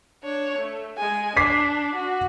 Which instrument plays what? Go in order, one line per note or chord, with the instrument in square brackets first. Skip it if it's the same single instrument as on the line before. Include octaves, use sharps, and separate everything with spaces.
[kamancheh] D4 C#5
A3
G#3 G#5
[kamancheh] D4 [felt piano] D6 B6 C7
[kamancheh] F#4